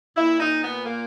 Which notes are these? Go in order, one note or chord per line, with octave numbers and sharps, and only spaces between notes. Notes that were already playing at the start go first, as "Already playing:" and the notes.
A#2 E4
D#4
B3
A#3